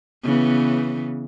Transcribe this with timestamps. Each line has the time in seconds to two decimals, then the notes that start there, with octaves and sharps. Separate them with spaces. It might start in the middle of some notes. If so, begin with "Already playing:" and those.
0.24 C#3 E3 B3